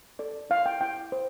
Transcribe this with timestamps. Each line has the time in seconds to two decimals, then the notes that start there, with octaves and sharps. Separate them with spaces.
0.19 A4 D5
0.50 E4 F5
0.66 G5
0.81 E4 G5
1.12 C5